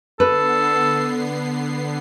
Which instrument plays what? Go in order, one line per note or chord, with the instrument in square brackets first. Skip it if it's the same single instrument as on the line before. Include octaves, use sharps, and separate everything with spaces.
[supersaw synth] D3 B3 C7 [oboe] A4 [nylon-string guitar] B4